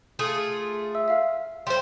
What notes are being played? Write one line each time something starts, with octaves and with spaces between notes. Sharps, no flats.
A3 F4 G#4
E5 E6
E5 F5 F6
G3 C5 C6